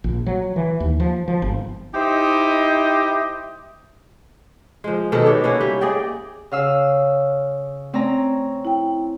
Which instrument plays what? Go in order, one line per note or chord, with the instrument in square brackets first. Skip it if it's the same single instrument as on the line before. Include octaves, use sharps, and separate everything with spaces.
[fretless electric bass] A#1
F#3
E3
D#2
F3
F3
G1
[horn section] D#4 E4 G4 C5 D#5
[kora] F3 G#3
B2 D#3 A4 D#5
D4 G4 C#5
A#3 C#4 E4 F#4
G3
G#4 D5 D#5 G5
[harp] C#3 F5 E6
[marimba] A3 D5 [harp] C4 C#4 A#5
[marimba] E4 G5